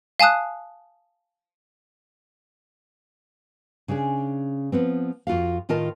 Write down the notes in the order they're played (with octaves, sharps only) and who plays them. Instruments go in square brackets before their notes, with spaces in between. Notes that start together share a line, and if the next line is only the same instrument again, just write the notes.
[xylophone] F5 G#5 A5 D#6 F#6
[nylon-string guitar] C#3 C#4 D4 G#4
F3 B3 C4
F2 F4 F#4 F5
A2 D#3 F4 A#4 D#5 A5